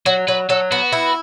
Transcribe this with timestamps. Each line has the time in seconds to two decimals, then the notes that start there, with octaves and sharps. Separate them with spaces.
0.06 F#3 F#4
0.28 F#3 B4
0.50 F#3 A4
0.71 B3 F#4
0.92 E4